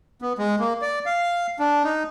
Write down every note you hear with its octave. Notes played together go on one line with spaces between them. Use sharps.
B3
G#3
A#3
D5
F5
D4
D#4